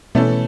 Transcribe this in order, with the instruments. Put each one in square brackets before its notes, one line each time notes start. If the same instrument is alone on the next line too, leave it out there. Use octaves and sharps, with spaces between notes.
[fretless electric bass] B2 [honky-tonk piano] E3 A3 C#4 E4 A4